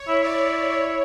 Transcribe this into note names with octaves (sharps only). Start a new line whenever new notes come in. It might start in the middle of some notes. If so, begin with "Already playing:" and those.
Already playing: C#5
E4
E4 D5
C#5